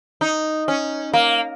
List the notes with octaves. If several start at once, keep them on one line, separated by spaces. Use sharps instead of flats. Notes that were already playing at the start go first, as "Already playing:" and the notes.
D#4
C#4
A#3